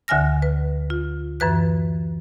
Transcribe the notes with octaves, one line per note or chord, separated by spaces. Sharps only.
D2 D3 E5 G#5 F6 A#6
B4
F4
F#2 E3 B4 F#6